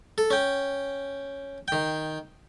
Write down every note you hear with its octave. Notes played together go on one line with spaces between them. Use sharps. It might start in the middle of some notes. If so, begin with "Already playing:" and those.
A4
C#4 G5
D#3 G5